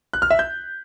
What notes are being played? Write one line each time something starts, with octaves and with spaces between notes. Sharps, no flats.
F#6
F6
E5
G6